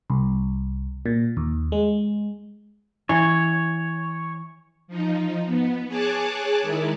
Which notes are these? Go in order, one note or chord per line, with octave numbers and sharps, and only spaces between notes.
C2
A#2
D#2
G#3
E3 C#5
F3 D#4
B3
G#4 C#5 G#5 A5 D6 F#6
D#3 G#3 D#4 E4